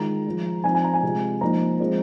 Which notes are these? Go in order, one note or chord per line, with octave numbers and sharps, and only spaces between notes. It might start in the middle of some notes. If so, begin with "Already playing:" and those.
Already playing: D#3 G#3 F4 A#5
F3 G#3 F4
F3 C4 D#4 G#5
G#5
A#5
G#5
C3 G#3 F4
F3 A#3 D#4 A#5
F3 G#3 C4